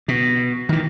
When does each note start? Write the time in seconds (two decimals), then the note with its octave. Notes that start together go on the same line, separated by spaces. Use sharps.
0.08 B2
0.69 D#3 E3